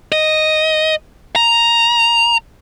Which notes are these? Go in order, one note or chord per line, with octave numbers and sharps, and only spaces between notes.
D#5
A#5